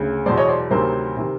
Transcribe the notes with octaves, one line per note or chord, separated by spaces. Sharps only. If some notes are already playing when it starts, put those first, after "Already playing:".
Already playing: D2 C#3
E2 B2 F#3 C5 D5
C#5 D#5
C5 D5
D2 C3 D#3 F#3 A#4 C5
C3 D#3